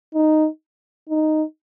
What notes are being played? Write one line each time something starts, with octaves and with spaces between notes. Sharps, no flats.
D#4
D#4